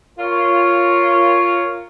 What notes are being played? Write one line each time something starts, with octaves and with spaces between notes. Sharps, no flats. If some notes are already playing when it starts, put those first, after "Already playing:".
F4 A#4 C#5